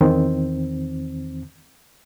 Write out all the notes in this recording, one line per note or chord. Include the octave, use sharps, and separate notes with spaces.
E2 D#3 C4